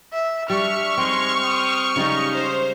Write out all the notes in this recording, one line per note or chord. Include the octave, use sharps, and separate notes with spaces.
E5
G3 D4 E5 C#6 F6
G#3 C4 D#4 C6
G5 C6 D#6
C#3 G3 G#3 D#4
C5